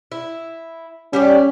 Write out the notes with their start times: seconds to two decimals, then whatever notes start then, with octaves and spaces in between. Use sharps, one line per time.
0.12 E4
1.13 G3 C#4 G4 D5